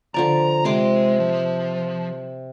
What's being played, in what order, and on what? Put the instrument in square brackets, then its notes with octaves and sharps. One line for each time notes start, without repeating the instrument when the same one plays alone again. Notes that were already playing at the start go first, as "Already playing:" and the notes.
[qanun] D3 F3 D5 [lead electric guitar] A#5
[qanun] C3 C6 D6 [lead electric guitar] G#3
[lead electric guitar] F3